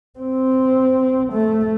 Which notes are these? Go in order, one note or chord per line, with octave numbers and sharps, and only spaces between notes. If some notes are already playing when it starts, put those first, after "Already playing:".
C4
A3